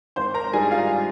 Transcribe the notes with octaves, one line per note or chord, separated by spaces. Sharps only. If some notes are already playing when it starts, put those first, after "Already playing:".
G#1 C5 C6
A#4 A#5
G#2 G3 D4 G#4 G#5
F4 F5